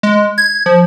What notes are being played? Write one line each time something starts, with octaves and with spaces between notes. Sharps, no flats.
G#3
G#6
F3